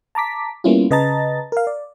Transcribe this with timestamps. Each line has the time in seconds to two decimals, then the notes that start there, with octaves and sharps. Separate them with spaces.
0.15 A5 A#5 D6 B6
0.64 G3 A#3 B3 C#4 E4 F4
0.91 C#3 B4 D#5 A5 A#5 A6
1.52 A#4 F5
1.67 D5